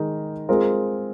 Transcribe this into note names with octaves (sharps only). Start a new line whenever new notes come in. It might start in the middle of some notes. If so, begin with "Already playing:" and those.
Already playing: D#3 G#3 D#4 A#4
G#3 C4 F4 A#4